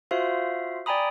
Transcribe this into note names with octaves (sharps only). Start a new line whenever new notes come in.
F4 F#4 C5 E5 F5
D5 G5 G#5 A#5 B5 D#6